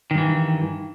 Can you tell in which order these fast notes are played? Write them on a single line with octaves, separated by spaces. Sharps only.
D#3 G2 E3